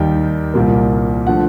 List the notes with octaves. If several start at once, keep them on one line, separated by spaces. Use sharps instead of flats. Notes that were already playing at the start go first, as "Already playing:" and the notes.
Already playing: D#2 D#3 G3 G5
C2 A#2 G3 A#3
D3 F3 A3 F#5